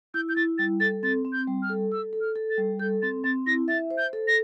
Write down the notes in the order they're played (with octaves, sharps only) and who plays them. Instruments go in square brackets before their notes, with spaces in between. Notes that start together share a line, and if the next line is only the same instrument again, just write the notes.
[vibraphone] E4 [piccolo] G6
[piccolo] G6
[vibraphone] E4 [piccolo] A6
[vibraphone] G3 [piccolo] A6
[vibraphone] A4 [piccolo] A6
[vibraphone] C4 [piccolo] A6
[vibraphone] C4
[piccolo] G6
[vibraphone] G3
[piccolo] F6
[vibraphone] A4
[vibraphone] A4 [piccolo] E6
[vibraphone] A4
[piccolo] F6
[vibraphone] A4
[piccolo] A6
[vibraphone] G3
[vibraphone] A4 [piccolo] G6
[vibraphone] C4 [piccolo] A6
[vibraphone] C4 [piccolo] A6
[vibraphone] E4 [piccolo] A#6
[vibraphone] E5 [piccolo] A6
[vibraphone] C5
[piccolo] G6
[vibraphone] A4
[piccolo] A#6